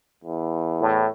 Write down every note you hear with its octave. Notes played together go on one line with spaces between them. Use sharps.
E2
A2